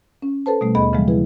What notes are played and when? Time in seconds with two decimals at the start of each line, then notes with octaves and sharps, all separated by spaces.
0.22 C#4
0.46 A4 B4 C5 A5
0.61 B2 G3 A3
0.75 D#2 B3 G#4 D#5 B5
0.93 C#3 E3 F3 G3 G#3
1.08 E4 G#4 B4